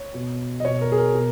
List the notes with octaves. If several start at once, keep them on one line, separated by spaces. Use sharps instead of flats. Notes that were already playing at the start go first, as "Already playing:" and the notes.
Already playing: C#5
B2
D#5
B2 C#5
A#4
G#4
A#4
B2